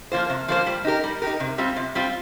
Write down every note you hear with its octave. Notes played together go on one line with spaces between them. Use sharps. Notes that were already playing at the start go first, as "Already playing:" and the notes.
F3 A#3 F4 C5
C3
F3 A#3 F4 C5
G3
D#4 G4 A#4
G3
D#4 G4 A#4
C3
G3 C4 F4
C3
G3 C4 F4